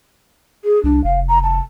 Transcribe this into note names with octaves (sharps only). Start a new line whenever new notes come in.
G#4
C2 D4
F1 F5
A#5
A5